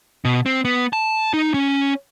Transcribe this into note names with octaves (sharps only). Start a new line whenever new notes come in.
B2
C4
B3
A5
D#4
C#4